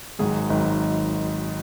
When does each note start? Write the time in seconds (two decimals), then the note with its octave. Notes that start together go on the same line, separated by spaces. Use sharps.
0.19 G#1 G#2 D#3 F#3 G#4
0.50 G#1 G#2 D#3 F#3